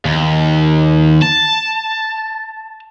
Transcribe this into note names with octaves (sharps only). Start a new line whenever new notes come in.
D#2
A5